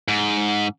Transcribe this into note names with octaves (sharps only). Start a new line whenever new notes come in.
G#2